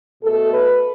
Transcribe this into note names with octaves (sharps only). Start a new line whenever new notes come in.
B2 A3 A4
B4